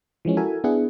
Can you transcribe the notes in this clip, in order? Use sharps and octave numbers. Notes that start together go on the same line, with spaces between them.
E3 F3 G#3 C#4
E4 F#4 A4 A#4 E5 G#5
B3 D4 E4 G#4 F#5